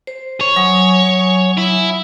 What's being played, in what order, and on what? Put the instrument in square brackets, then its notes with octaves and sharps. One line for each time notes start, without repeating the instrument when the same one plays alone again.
[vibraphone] C5
[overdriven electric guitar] C#5
[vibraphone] F#3 G#5 D#6
[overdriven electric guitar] E4